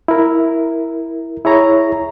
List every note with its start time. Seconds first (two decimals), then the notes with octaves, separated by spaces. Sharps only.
0.08 E4 A#4
1.45 E4 G#4 C#5 A#5